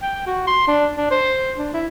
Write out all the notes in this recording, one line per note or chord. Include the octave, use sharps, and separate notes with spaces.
G5
F#4
C6
D4
D4
C5
D4
E4